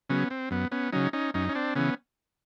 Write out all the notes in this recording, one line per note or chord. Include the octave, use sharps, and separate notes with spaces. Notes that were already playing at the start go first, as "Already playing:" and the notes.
C#3 F#3 B3 C#4
C4
F#2 B3
B3 C#4
C#3 F#3 C#4 D#4
C#4 D#4
F#2 C#4 D#4
C#4
C4 D4
C#3 E3 B3 C#4